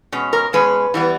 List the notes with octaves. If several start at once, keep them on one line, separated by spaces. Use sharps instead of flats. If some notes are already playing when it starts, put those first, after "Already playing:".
B2 G#3 C#4
A#4
B2 G#3 C#4 B4
E3 G3 B3